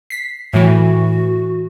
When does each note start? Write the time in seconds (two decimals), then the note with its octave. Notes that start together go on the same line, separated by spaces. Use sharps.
0.10 B6 C7
0.53 A2 E3 F#4